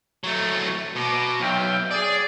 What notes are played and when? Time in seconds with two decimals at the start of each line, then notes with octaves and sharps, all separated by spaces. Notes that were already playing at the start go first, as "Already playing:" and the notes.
0.24 F#3 A3
0.96 B2 F#4 A#5 D6
1.40 B1 E5 F5 G5
1.91 G#4 D5